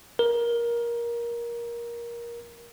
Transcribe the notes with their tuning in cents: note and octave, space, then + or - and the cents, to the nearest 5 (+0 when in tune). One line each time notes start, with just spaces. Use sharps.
A#4 +15